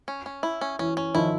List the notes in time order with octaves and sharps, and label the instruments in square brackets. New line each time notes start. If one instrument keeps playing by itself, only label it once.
[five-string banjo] C#4
C#4
E4
C#4
[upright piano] E3 [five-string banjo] C#4
[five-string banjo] C#4
[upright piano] D#3 F3 [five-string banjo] E4